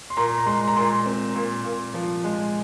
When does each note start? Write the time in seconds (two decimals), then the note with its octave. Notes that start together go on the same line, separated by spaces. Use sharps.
0.10 C6
0.17 A#2 A#5
0.38 A#5
0.46 G#3 C6
0.68 A#5
0.76 A#2 C6
1.06 C4
1.36 A#2
1.64 A#2
1.94 F3
2.24 G#3